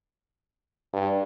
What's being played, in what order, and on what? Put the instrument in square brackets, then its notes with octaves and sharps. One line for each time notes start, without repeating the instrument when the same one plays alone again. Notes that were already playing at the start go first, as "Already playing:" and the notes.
[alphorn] G2